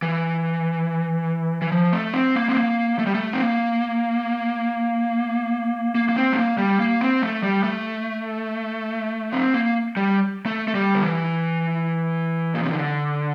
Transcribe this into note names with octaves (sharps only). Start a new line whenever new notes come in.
E3
E3
F3
A3
C4
A#3
C4
A#3
A3
G3
A3
C4
A#3
A#3
A#3
C4
A3
A#3
G3
A#3
C4
A3
G3
A3
C4
A#3
G3
A3
A3
G3
D3
E3
A#2
C3
D3